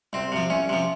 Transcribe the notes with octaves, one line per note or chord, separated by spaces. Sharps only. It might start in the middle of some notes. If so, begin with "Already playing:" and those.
C2 C4
C3 F3
C2 C#4
C3 F3